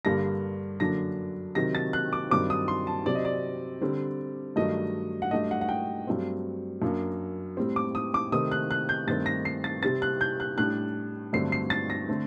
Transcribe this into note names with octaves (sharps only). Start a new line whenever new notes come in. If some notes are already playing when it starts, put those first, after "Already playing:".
G2 D3 G3 A#3 D4 A#6
F#2 D3 F#3 A#3 D4 A#6
C3 D#3 F#3 C4 A#6
A6
F#6
D6
G2 D#3 F#3 C4 D6
D#6
C6
A5
C3 F#3 C4 D5
D#5
D5
D3 G3 C4
G2 D#3 F#3 A3 D4 D#5
F#5
G2 F#3 A3 D4 D#5
F#5
F#5
G5
G2 F#3 A3 C4
F#2 F#3 A#3 D4
A2 G3 C4
D6
D#6
D6
C3 D#3 A3 C4 D#6
F#6
F#6
G6
G2 D#3 A3 C4 A6
A#6
C7
A6
C3 G3 C4 A6
F#6
G6
F#6
A2 G3 D4 F#6
G2 D3 F#3 A3 C4 C7
C7
A6
A#6
D3 A3 C4